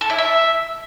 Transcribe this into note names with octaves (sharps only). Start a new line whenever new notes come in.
A4
E4
E5